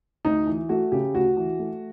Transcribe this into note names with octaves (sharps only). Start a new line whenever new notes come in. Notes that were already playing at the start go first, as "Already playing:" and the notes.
D2 D#4
E3
A3 F#4
C#3 G4
D2 F#4
E3
A3